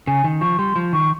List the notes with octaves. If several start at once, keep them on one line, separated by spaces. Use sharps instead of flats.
C#3 G#5
D#3
F3 C#6
G3 C6
F3
D#3 C#6